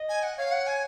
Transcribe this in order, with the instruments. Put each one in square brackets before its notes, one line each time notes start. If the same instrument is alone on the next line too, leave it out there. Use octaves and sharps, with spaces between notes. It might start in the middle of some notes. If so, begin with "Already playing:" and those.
Already playing: [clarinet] D#5
[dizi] G#5
F#5
[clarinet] C#5 [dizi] F5
[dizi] F#5
G#5